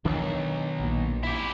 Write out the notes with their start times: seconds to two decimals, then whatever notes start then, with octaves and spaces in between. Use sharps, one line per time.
0.05 B1 D#3 D4
0.80 A#1 A#2
1.23 E4 G4